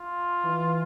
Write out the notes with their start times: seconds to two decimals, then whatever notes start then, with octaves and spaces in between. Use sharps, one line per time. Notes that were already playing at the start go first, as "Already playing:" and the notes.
Already playing: F4
0.45 E3